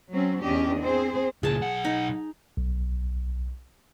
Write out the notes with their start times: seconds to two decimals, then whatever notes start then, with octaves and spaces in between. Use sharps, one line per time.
0.11 F#3 C4 C#4
0.43 E2 C#4 D4 G4 D#5
0.82 C4 G#4 C5
1.43 C#2 A#2 G#4 A5
1.62 B1 F#5
1.85 D#4
2.57 B1